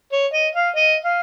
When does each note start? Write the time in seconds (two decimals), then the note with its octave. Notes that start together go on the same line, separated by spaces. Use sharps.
0.12 C#5
0.33 D#5
0.55 F5
0.76 D#5
1.04 F5